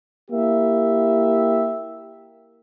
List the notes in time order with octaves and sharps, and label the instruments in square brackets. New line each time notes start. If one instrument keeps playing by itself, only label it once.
[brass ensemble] A#3 E4 G4 E5